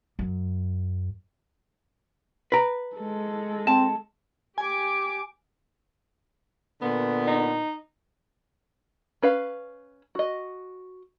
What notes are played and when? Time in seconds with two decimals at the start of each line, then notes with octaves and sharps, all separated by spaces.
0.19 F#2
2.52 B4 A#5
2.97 G#3 A4
3.67 C4 A5
4.58 G4 G#5 D6
6.81 A#2 D3 B3
7.27 D#4
9.22 C#4 B4 F5
10.15 F#4 D#5